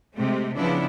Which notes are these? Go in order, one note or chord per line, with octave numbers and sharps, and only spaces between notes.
C3 G#3 A3
C#3 F3 B3 D4 E4